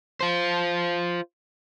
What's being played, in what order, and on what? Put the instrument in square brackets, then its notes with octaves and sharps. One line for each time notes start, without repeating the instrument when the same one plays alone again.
[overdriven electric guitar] F4 C5